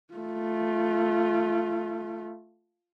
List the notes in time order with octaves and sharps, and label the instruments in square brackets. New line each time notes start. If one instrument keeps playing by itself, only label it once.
[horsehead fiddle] A3 F4